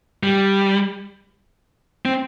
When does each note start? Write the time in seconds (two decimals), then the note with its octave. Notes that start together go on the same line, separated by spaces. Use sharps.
0.23 G3
2.05 C4